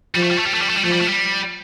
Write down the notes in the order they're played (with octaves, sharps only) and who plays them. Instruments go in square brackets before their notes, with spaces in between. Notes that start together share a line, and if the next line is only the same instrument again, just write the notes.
[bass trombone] F3 [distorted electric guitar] G3
[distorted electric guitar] A3
G3
A3
G3
A3
G3
A3
G3
[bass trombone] F3 [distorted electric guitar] A3
[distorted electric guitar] G3
A3
G3